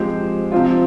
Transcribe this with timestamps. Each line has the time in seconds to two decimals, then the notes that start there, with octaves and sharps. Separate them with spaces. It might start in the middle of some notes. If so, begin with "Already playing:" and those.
Already playing: F3 G#3 C4 G4 C5
0.52 C3 F3 C4 F4